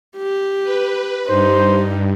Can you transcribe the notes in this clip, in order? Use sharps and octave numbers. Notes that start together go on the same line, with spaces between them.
G4
B4
G2 D#4 G4 C5